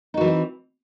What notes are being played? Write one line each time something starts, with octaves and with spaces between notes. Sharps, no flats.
E3 G3 C4 D#4 F#4